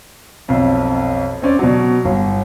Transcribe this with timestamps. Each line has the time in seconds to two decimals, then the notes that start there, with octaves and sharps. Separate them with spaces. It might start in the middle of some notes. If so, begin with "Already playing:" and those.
0.48 B1 F2
1.42 C4 C#4 D5
1.59 B2 F#3
2.05 G1